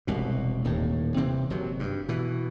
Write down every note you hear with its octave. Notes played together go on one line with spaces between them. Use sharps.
E1 C2 B2
D#1 D#2 A2
C3 E3 C4
F#1 C3 F#3
G2
B2 E3